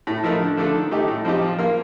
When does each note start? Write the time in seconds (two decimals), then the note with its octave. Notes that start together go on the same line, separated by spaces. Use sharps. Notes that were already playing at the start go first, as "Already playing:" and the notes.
0.07 A2
0.23 F3 A3 D#4 A#4
0.40 D3
0.57 F3 A3 D4 A4
0.74 D#3
0.91 A3 D#4 G4
1.08 A2
1.25 F3 C4 D#4 G4
1.41 F3
1.59 A#3 F4 A#4